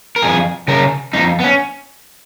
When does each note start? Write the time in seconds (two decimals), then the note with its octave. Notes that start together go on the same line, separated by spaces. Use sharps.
0.16 A#4
0.22 F2 G#4
0.68 C#3 A#4
1.13 F2 D#4
1.40 B3
1.44 C#4